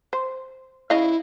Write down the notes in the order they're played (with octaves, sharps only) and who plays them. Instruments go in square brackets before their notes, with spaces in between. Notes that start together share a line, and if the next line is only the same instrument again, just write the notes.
[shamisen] C5
[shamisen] C#3 D#5 F5 [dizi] E4